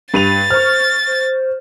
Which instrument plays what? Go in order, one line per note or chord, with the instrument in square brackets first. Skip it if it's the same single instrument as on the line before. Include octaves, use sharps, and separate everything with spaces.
[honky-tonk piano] G2 D#7 F7 [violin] A6
[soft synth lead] C5 [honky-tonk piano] C#6 F6
[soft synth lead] C5